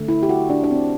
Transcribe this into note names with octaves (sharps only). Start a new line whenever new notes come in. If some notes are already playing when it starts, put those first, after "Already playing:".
Already playing: D3 A3
E4
G4
F#4
D4
D4
C4